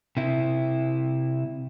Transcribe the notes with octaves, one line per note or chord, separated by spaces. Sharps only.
C3 E4